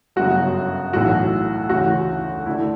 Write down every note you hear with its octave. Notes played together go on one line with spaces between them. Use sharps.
G1 F#2 C#3 F#4
B1 A2 E3 F#4
D2 C#3 E3 F#4
D2 D3 E4